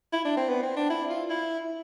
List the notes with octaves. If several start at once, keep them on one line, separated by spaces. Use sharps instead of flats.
E4
D4
C4
B3
C4
D4
E4
F4
E4